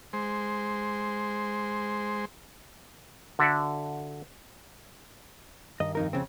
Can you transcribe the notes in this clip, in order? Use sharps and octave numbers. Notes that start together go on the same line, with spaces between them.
G#3 C5
D3 F#4 A4 D5 E5
G2 D#3 D#5
F2 D#4 A#4
F2 C#3 C4